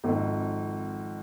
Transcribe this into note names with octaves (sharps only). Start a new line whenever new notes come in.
G#1 F2